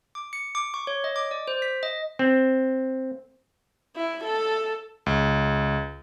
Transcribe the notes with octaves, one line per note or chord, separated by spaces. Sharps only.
D6
C#7
D6
C#6
C#5
D#5
D6
D5
C5
B6
D#5
C4
E4
A4
C#2